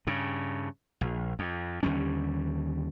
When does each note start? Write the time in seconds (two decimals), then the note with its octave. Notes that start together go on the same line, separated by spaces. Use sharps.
0.07 G2 C#3
1.01 A#1
1.39 F2
1.83 D#2 D3 G3 C#4